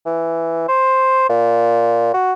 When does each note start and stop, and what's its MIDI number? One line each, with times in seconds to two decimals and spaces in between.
0.05 0.64 52
0.68 1.24 72
1.29 2.12 46
2.14 2.33 66